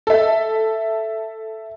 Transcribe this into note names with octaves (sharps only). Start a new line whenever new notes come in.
A4 E5